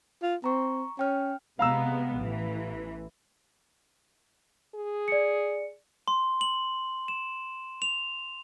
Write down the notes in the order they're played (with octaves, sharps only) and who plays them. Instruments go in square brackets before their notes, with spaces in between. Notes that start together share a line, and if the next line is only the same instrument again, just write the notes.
[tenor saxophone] F4
[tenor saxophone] C4 [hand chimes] A#5 C#6
[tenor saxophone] C#4 [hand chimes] G5 F6
[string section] C3 G#3 B3 [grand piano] F5 A#5 E6
[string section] A1 E3
[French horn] G#4
[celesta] D5 C#7
[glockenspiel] C6
F#7
E7
F7